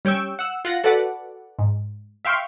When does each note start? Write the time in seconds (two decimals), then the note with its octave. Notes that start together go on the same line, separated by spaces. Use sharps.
0.05 G3 C#4 G5 C#6 E6
0.39 F#5 E6
0.65 F4 F#5 A#6
0.84 F#4 A4 B4 D5 F#5
1.59 G#2
2.25 E5 F5 G5 C6 C#6 F6